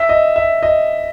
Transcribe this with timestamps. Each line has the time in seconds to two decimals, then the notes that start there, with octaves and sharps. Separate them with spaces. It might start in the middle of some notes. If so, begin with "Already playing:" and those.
Already playing: E5
0.09 D#5
0.36 E5
0.63 D#5